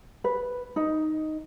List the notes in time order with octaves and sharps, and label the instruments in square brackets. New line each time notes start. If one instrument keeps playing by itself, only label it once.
[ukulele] B4
D#4